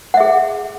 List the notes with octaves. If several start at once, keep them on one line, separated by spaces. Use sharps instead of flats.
G#4 E5 F#5